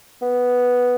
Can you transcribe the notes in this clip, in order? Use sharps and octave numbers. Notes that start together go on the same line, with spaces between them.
B3